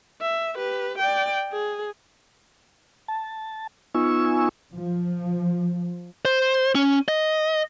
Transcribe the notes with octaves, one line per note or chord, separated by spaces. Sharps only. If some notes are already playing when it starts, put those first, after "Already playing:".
E5
G4 B4
D5 G5
G#4
A5
B3 D#4 F4 G#5 C#6 E6
F3
C5
C#4
D#5